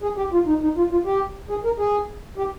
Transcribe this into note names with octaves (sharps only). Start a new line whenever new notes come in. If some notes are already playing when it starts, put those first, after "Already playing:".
G#4
G4
F4
D#4
D#4
F4
F4
G4
G#4
A#4
G#4
G4